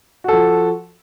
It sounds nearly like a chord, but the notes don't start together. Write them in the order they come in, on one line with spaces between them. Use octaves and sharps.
F#4 A4 F3